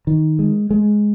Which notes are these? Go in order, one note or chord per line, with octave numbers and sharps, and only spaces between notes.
D#3
G#3
G#3